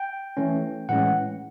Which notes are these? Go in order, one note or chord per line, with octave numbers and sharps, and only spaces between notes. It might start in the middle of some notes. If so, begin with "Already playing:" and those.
Already playing: G5
E3 A3 C#4
A2 E3 G#3 C#4 F#5